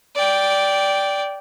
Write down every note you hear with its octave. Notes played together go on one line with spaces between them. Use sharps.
D5 G5